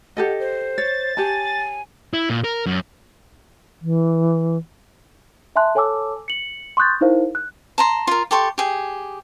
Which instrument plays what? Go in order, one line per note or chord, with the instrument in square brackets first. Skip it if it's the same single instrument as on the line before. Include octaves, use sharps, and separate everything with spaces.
[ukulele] G4 A4 D#5 [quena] F#5
[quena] C5
[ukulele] C#5 [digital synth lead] A6
[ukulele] G4 C#5 A5 [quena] G#5
[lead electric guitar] E4
A#2
A#4
F#2
[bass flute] E3
[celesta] E5 G#5 A5 C6 F#6
A4 C#5 G#5 A5 D6 E6
C#7 F#7
C6 C#6 D#6 F#6 G6 A6
D#4 E4 A#4 C5 F5
F#6
[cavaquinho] A5 A#5 C6
F4 A#4
G4 A4 C6 C#6
G4 G#4